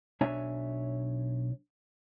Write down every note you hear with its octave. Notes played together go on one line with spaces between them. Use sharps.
B1 D4 C#5 E5 G#5